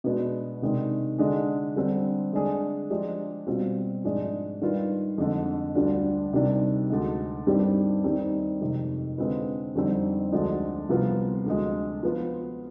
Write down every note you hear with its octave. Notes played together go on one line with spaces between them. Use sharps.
B2 G#3 B3 D4
C3 D#3 G#3 D4
D3 G#3 D4 G#4
D3 G3 C4
D3 G#3 D4 G#4
F3 G#3 D4 G4
B2 G3 C4 F4
G#2 F3 G#3 D4 G#4
D#3 G3 D4 F4 B4
F2 D3 G#3
D2 D3 G3 D4 F4
C3 D#3 G3 D4
D2 D3 G#3
G2 D#3 G3 C4 G4
D#2 D#3 G3 C4 D#4
F2 C3 D#3 G#3
D3 G#3 C4 F4 B4
F2 D3 G3 C4 D#4
D2 D3 F3 G#3 D4
C2 C3 F3 B3 F4
D2 D3 F3 G#3
F3 B3 F4